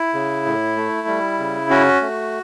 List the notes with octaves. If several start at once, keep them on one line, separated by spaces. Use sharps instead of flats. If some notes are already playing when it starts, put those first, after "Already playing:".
Already playing: E4
C#3
A2
A3
G3
C#3
C#4 F#4
A3